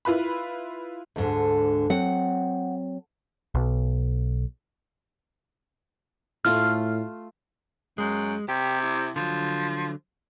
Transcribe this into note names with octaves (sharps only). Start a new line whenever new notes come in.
E4 F4 B4 B5
D2 G#2 D3
F#3 C4 F#5
B1
A2 A3 F4 F6
F#2 G#3
C3 G4
E4
D3 F3 F#3